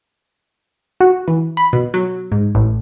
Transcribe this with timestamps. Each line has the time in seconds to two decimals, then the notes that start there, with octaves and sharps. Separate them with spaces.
1.01 F#4
1.28 E3
1.57 B5
1.73 B2
1.94 F#3
2.32 G#2
2.55 A1